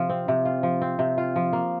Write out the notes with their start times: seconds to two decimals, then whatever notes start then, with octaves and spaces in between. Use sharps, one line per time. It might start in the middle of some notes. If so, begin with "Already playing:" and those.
Already playing: C3 F3 F4
0.09 C4
0.28 C3
0.45 F4
0.63 F3
0.82 C4
0.99 C3
1.18 F4
1.36 F3
1.53 A#3